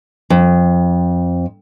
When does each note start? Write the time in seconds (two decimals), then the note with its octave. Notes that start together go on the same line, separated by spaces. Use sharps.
0.30 F2